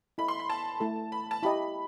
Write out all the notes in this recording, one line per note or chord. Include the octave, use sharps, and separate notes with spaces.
E4 A4 D#5 B5
C6
B5
A5
A3 E4 A4
B5
A5
E4 G4 D#5 B5